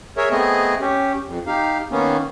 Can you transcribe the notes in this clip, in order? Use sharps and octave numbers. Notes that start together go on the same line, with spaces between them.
G#4 A#4 C#5 E5
A3 B3 C4 G#4 D#5
C#4 G4
F2
D#4 G4 F5
D#3 A#3 B3 C#4